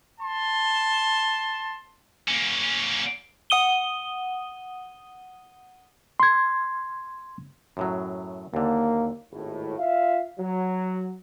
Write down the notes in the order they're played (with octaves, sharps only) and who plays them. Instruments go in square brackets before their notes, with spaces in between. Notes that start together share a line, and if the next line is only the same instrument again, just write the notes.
[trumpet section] A5 C6
[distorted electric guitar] A#3 C#4
[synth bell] F#5 D#6 D#7 G7
[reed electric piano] C6 G#6
[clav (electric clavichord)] F#2 A2 F#3
[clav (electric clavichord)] D#2 D3 [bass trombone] A#3
[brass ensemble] G#1 D#2 A2
F4 E5 F5
F#3